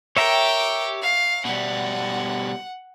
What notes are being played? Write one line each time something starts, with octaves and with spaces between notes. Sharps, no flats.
G4 A#4 C#5 E5 G5 A#5
F5
B2 G3 F#5